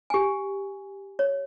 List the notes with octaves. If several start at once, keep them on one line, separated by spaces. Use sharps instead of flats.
G4 G#5
C#5